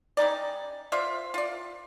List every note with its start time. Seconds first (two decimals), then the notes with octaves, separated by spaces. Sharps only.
0.17 G3 C#4 D#4 D5
0.92 F4 C5 D5 E5
1.34 F4 D5